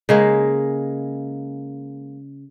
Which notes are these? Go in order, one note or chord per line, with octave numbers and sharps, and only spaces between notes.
C#3 G#3 A#3